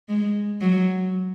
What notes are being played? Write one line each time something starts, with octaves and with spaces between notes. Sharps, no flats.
G#3
F#3